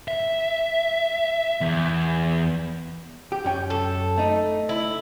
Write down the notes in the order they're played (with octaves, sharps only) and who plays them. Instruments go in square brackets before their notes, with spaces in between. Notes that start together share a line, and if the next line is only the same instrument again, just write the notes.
[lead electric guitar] E5
E2
[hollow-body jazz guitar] G4
F#2 C#4 G5
[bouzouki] A4
[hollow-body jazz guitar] A3 D#4
[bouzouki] E4